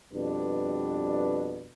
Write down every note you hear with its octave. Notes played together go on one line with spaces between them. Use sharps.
F2 B2 G3 D4 B4